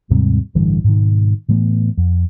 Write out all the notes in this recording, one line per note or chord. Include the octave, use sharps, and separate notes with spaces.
D#2 G#2 C3 G3
A1 G2 D3 E3
G#2 B2 D#3
A2 E3 A3 B3
F2